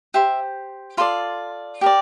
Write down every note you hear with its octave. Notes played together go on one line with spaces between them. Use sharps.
G4 C5 E5
F4 A4 D5 C6
G4 A#4 D5